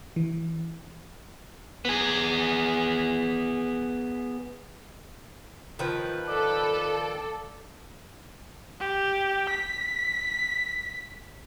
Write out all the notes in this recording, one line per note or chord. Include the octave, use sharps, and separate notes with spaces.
E3
B3 G#4
D#3 F3 B4
A4 D5
G4
B6